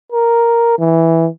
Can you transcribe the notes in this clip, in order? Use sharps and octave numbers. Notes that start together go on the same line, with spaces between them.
A#4
E3